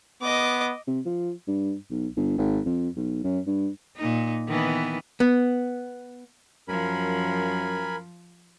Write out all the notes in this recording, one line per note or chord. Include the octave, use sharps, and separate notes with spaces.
B3 D#5 D6
C3
F3
G2
B1
G1
G#1
F2
B1
F#2
G2
A#2 D#4
D#3 E3 B3
B3
F#2 F3 A#4 G#5 B5